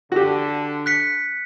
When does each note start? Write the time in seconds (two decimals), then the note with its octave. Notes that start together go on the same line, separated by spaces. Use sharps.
0.12 D3 F#4 G4
0.86 F#6 B6 C#7